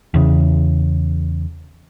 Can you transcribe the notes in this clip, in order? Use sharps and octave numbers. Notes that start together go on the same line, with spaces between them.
E2 C#3